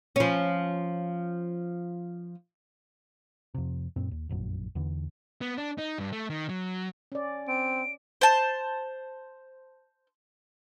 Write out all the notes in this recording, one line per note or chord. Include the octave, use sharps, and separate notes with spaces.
F3 C#4
F2 C3
F#2 A#2 C4
D#2
F1 A#1 F#2
E2 D3 E3
B3
D4
D#4
G2
A3
D#3
F#3
C#4 D5
C4 D7
C5 A5